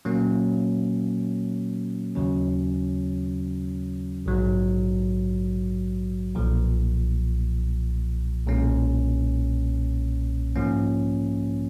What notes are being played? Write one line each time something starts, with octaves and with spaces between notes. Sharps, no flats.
A#2 F#3 A#3 C#4
D#2 C#3 F#3 C#4
A#1 G#2 F#3
B1 A#2 F3
B1 A#2 G#3 C#4
G#2 F3 A#3 C#4